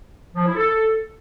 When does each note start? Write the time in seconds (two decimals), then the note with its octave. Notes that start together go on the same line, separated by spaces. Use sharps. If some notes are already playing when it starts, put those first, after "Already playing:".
0.35 F3
0.45 E4
0.55 A4